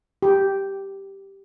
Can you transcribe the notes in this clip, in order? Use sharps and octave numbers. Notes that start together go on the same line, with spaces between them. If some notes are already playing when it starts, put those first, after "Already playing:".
G4